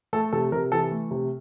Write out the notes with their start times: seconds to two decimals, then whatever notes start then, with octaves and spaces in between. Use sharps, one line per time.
0.13 A3 A4
0.33 C3 A4
0.52 C3 A#4
0.72 E3 A4
0.91 A3
1.11 C3